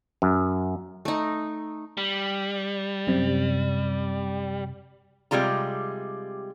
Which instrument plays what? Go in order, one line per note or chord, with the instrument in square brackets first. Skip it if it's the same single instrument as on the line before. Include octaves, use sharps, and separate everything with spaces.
[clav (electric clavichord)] F#2
[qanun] A3 D#4
[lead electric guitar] G3
[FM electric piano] F#2 C3
[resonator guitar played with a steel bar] C3 G3 G#3 F4 A#5